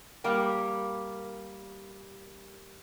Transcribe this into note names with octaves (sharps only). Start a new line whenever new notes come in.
G3 A#3 G4